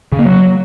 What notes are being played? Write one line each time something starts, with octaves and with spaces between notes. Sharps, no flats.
C#3
A#3
F#3